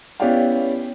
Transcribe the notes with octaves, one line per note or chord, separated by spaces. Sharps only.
B3 C#4 E4 G4 D5 F5